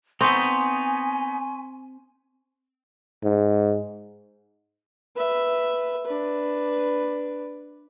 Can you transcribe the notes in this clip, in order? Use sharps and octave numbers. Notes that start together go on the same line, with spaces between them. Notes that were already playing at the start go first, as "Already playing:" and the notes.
B3 C4 D#4 G#5 C6 C#6
G#2
B4 E5
D4 B4